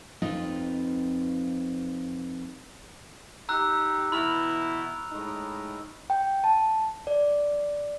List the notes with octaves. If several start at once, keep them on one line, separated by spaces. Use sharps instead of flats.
F2 C4 D#4 F4 B4
D#4 G4 A#5 E6 F#6
B2 E3 E4 B5 F6 F7
A2 G#3 D#4
G5
A5
D5